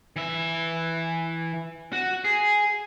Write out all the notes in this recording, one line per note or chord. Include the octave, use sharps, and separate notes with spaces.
E3 E5
F#4
G#4